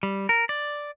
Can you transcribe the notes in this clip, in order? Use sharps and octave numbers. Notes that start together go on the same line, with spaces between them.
G3
A#4
D5